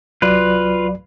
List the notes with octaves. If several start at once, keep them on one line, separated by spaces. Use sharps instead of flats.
C2 F#3 F4 B4 D5